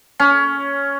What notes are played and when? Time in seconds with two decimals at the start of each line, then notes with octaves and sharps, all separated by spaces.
0.20 C#4